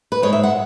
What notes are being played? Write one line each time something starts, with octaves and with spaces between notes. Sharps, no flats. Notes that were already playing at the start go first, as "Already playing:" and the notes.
B4
G#2 G#3 C#5
E5
F#5